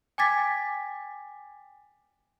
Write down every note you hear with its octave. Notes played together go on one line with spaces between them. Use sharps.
G5 G#5 D6 G#6 A6 B6